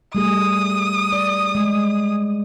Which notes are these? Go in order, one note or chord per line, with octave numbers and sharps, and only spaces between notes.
G3 A3 G#4 D#6
D5
G#3